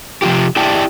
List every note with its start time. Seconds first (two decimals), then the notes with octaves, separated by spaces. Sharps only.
0.22 C3 F3 F#3 F4 G4
0.56 E4 G4 D5 G5 A5